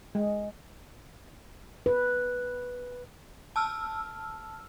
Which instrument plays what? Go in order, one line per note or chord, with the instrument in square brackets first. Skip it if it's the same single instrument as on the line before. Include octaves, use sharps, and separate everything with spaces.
[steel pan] G#3
[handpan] B4
[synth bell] A5 E6 F6